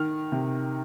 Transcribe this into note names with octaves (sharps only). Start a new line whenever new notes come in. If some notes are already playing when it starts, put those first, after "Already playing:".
Already playing: D#3 F6
C3